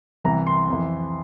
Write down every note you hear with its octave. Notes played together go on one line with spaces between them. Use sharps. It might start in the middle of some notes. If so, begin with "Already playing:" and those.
C2 C3 E3 A#5
C6
F2 E3